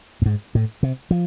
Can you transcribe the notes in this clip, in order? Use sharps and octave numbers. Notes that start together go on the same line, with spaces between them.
A2
G#2
A2
C3
F3